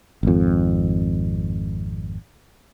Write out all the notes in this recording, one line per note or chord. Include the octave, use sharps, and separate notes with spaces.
G#1 F2